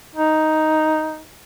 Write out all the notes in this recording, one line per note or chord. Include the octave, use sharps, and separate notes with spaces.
D#4